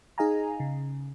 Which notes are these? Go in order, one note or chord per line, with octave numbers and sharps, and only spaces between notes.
D#4 G#4 D#5 F5 G#5 A#5
C#3